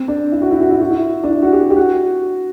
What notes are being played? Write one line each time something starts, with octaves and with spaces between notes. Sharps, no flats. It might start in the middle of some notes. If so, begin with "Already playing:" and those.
Already playing: C4
D4
E4
F#4
E4
F#4
E4
F#4
E4
D4
E4
F#4
G4
G4
F#4